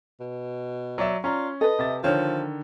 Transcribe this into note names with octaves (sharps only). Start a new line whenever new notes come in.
B2
F#3 D5 E5
C#4 F4 D5 A#5
A4 B4 D#5
C3 E5 A6
D3 D#3 F3 C#5